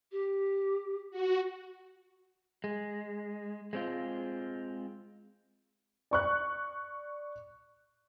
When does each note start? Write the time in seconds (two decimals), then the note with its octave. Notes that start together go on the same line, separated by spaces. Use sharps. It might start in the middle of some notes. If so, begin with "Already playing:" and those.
0.11 G4
1.11 F#4
2.64 G#3
3.73 G#3 C4 F4
6.11 D5 C#6 F#6